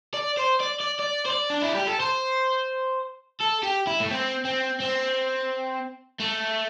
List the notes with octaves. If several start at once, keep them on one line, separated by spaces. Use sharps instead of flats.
D5
C5
D5
D5
D5
C5
D5
D4
E4
G4
A4
C5
A4
G4
E4
A3
C4
C4
C4
A3